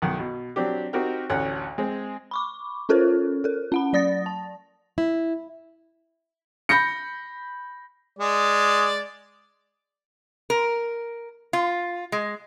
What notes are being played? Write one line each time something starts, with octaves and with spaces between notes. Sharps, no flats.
B1 D#3 F#5
B2
F#3 C4 D4 G4
C4 D#4 F#4 G4 A#4 G5
A1 D2 C#5 F#5
G#3 C4
B5 C#6 D6
C#4 F4 A4 A#4 C5 C#5
A4 A#4
C#4 F#5 B5
F#3 D5 D#6 A6 A#6
A5
E4
B5 G6 A#6 C#7
G#3 D5
A#4
F4
G#3